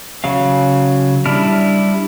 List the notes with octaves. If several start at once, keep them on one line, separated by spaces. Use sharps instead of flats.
C#3 F#3 F5
G3 D4 E4 F6